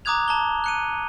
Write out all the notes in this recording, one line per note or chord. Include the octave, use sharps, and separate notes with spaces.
A#5 D6 D#6 F#6 G#6 F7
A5 A#5 G7
F#6 C#7 D#7